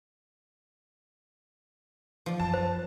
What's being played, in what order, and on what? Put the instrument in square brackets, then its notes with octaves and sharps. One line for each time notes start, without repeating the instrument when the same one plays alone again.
[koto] F3 D5
[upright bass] F#2 [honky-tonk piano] A5
[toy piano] C5